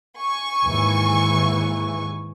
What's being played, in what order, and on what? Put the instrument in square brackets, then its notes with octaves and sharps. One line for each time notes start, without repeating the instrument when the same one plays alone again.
[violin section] G#5 C#6
[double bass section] D#2 G#2 E3